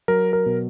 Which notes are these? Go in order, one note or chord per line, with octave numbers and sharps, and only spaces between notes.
F#3 A#4
A#4
B2